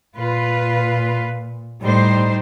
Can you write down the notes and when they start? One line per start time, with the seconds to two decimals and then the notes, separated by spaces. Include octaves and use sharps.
0.16 A#2 F4 B4
1.82 A2 G3 D#4 C5